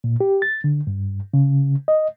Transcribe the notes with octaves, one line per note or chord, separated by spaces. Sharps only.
A#2
G4
A6
D3
G2
C#3
D#5